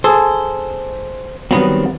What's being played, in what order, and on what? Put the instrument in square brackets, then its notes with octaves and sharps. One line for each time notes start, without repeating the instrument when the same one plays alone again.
[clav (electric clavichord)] G#4 A4 [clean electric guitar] C5
[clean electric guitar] D#3 G3 C4 [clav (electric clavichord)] F#3 B3